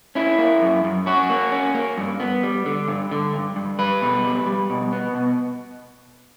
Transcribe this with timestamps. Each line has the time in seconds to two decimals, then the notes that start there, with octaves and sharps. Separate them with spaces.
0.15 C#4 E4
0.38 A#3
0.62 F#2
0.84 F#2
1.06 C#4 F#4
1.30 A#3
1.52 C#4
1.74 A#3
1.98 G2
2.20 B3
2.43 G3
2.66 D3
2.88 G2
3.11 D3
3.34 G2
3.56 G2
3.79 G3 B4
4.01 B2
4.24 G3
4.47 G3
4.70 B2
4.93 B3
5.15 B2